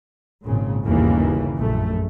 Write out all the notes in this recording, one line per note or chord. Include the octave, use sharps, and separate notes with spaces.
G#1 A#2 C#3
G1 D#2 A#2 C#3 E3 A#3
A#1 F#2 A3